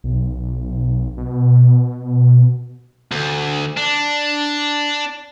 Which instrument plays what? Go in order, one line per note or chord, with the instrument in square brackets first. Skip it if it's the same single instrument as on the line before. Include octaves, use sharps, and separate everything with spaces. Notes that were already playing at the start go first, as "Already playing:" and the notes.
[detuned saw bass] B1
B2
[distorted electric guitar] D2
D4